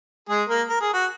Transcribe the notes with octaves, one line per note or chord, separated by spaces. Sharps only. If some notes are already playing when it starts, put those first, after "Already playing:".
G#3 G#4
A#3 A#4
A#4
G#4
F#4